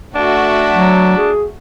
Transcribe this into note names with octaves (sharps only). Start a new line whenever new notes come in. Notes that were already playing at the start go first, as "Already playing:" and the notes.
A3 D4 F#4 E5
F#3
G#4